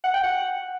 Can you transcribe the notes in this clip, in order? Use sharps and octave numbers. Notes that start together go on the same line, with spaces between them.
F#5
G5
F#5